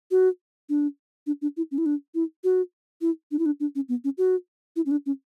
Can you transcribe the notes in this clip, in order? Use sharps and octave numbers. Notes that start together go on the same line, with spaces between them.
F#4
D4
D4
D4
E4
C#4
E4
D4
E4
F#4
E4
D4
E4
D4
D4
C#4
B3
C#4
F#4
E4
C#4
D4
C#4